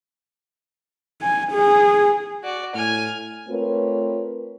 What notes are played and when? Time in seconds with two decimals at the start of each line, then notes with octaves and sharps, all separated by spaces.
1.22 G#5
1.52 G#4
2.44 F#4 D5
2.75 A2 G#5 F6
3.49 A3 C4 F4 A#4 B4 C#5